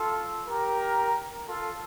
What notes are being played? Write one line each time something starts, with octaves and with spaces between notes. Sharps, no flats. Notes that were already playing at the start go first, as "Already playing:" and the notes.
Already playing: F4 A4
G4 A#4
F4 A4